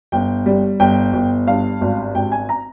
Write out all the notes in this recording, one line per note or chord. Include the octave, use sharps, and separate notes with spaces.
G1 G5
G3
G1 G5
G1
G2 F5
G#1
G#1 G5
G#5
A#5